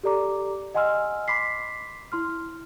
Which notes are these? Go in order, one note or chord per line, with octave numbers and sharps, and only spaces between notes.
G4 A4 D5 A#5 D6
D#5 F#5 G#5 C6 E6 F6
B5 C6 D6 B6 C7
E4 C6 F6